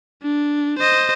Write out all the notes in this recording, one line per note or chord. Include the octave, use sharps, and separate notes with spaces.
D4
C5 D#5